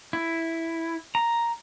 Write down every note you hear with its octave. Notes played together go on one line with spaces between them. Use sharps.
E4
A#5